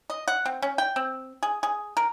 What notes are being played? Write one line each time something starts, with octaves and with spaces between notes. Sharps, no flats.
D#5
F#5
C4
C#4
G5
C4
G#4
G#4
A#4